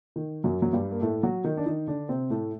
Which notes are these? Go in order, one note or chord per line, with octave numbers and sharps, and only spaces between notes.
D#3
F#2 F#3
F#3
G2 G3
A#3
A2 A3
F#3 F#4
D#3 D#4
D4
D#3 D#4
D3 D4
C3 C4
A2 A3